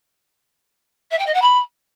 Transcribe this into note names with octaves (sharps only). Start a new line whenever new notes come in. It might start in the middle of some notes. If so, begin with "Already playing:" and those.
E5
G5
D#5
F#5
B5